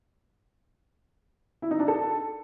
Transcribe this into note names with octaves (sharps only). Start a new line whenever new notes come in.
E4
D#4
D4
A4